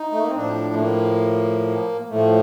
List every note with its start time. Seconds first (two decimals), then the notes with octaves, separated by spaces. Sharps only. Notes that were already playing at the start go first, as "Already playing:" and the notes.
Already playing: D#4
0.12 A3
0.20 A#3
0.28 C4
0.35 A2 F3 D4
0.75 A3
0.79 A#3
2.10 A2 F3 A3